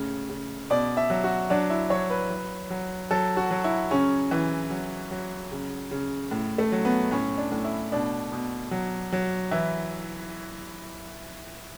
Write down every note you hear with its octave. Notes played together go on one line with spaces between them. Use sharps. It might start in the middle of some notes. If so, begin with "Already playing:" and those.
Already playing: A2 C#3
C#3
B2 D5
E5
F#3
F#4
F#3 D4
E4
F#3 C#5
B4
F#3
F#3
F#3 A4
F#4
F#3
E4
C#3 C#4
E3
F#3
F#3
C#3
C#3
A2
A3
F#3
B3
A2 C#4
D4
A2
E4
B2 D4
B2
F#3
F#3
E3 E4